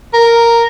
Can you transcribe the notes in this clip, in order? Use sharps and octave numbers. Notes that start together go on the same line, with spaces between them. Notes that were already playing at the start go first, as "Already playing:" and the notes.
A#4